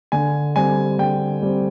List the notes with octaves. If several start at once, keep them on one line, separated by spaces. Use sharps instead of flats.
D3 G#5
G3 C4 G#5
D3 G5
G3 C4